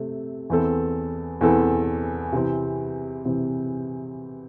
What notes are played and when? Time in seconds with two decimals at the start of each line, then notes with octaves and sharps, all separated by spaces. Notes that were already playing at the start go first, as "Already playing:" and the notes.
Already playing: C3 A3 C4 A4
0.50 E2 E3 C4 A4
1.41 E2 E3 C4 A4
2.32 C3 E3 C4
3.25 C3 E3 C4